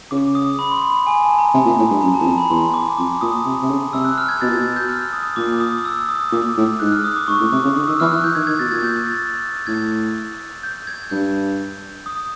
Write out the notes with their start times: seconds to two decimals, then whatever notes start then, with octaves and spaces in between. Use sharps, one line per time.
0.11 C#3 D6
0.35 D#6
0.59 B5
0.71 C6
0.82 B5
1.07 G#5
1.23 A5
1.39 A#5
1.54 C3
1.66 A#2
1.78 A2
1.90 G2
2.01 F#2 A#5
2.14 A5
2.20 E2
2.26 F2 A#5
2.38 B5
2.50 E2 C6
2.74 D6
2.98 F2 D6
3.21 A#2 D#6
3.45 C3
3.62 C3
3.70 C#3
3.93 C3 E6
4.05 F#6
4.18 F6
4.29 G#6
4.41 B2 A6
4.49 A#2
4.53 B2 G#6
4.76 G6
4.88 F6
5.13 D#6
5.36 A#2 D6
5.60 D#6
5.85 E6
6.09 D#6
6.32 A#2 D6
6.57 A2
6.80 G#2 F#6
6.92 F6
7.04 D#6
7.16 D6
7.27 G#2 C#6
7.40 A2
7.52 C3 D6
7.64 C#3
7.76 D3 D#6
7.87 D#3 E6
8.00 E3 F6
8.11 E3 F#6
8.23 E3 G6
8.35 D#3 G#6
8.47 D#3 G#6
8.59 B2 A6
8.71 A#2 G#6
8.84 G6
8.96 G#6
9.07 A6
9.67 A2 G#6
10.63 G6
10.87 G#6
11.10 G2 G6
12.06 D#6